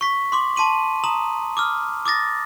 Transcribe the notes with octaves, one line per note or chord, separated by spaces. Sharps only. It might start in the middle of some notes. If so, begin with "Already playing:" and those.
C#6 B6
C6 D6 F#7
A5 C6 D#7 F#7
A#5 D#6 F#7
D6 D#6 F6
D6 D#6 A6 A#6